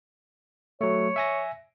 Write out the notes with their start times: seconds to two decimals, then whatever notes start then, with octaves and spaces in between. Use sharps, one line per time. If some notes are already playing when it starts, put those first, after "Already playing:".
0.81 F#3 A3 C#5
1.16 E5 G#5 A#6